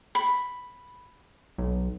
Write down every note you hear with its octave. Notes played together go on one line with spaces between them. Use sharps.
B5
B1